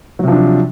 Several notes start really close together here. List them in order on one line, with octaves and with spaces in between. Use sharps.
F#3 C3 F3 D4